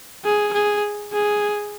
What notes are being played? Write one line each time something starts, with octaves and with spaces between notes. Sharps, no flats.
G#4
G#4
G#4